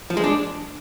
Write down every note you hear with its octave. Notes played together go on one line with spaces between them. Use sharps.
F3
G#3
D4